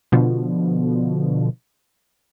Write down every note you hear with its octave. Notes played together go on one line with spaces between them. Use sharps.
B2 D3 F3